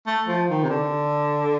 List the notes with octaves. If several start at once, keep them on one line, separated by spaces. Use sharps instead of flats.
A3
F3
D#3
C3
D3